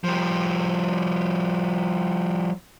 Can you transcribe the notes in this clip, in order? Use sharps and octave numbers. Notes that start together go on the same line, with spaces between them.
F3 G3